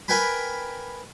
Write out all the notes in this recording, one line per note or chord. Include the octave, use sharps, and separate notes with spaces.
A#4 B4 G5 G#5 B5